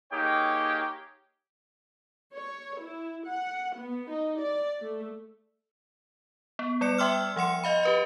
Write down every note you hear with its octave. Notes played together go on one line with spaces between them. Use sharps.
A#3 D#4 G4 G#4 C#5 G5
C#5
E4
F#5
B3
D#4
D5
A3
B3
G3 D5 C#7
E5 G5 C6 D6 E6 F6
F3 F#5 C6 C#7
D#5 F5 B5
G4 B4 D#5